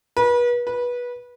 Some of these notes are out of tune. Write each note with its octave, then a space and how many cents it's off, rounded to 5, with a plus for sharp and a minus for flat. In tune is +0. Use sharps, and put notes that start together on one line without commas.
B4 -35
B4 -20